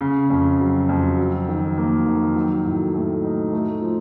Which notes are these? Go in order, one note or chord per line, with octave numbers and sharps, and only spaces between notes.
C#3
F2
F#3
F2
F#3
D#3
A#3
D#3
F#3
A2
A3
D#4
A3
F3